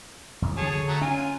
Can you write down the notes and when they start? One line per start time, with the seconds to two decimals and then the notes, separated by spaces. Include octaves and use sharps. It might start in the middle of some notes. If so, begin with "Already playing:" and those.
0.42 A1 E2
0.57 D3 F#3 G#4 C#5 A5
0.73 D3
0.88 F#3 A3 A#5
1.01 C#4 F4 G#5